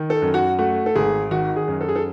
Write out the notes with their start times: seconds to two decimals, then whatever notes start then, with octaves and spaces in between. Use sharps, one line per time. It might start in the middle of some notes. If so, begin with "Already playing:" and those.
Already playing: D#3
0.10 A4
0.22 F#2
0.34 F#4
0.59 A3 F#4
0.86 A4
0.95 G#1 G#4
1.31 D#3 F#4
1.56 G#4
1.68 F#2
1.81 A4
1.89 G#4
1.96 A4